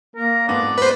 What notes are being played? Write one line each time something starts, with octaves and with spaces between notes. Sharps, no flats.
A#3 A#4
F2 G#2 B3 D5
B4 C5